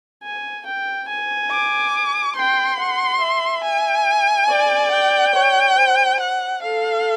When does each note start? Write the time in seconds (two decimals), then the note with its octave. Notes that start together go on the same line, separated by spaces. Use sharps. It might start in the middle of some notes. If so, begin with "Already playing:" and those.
0.23 G#5
0.66 G5
1.08 G#5
1.51 D6
2.36 G5 C6
2.79 F#5
3.21 E5
3.64 G#5
4.49 D5
4.91 G5
5.35 C#5
5.77 C5
6.20 F#5
6.63 A4 F5